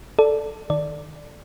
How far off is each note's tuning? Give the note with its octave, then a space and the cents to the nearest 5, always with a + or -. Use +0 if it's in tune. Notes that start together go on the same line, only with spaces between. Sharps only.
A4 +0 D5 +0
D#3 -15 D5 +0